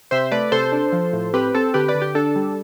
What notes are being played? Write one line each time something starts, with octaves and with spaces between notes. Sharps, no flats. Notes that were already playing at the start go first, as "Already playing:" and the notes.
C3 C5 E5
A3 B4 D5
C3 A4 C5
D4
F3
A2
C4 G4 B4
C4 A4
D3 G4 B4
B4 D5
D3
G4
D4 A4
G3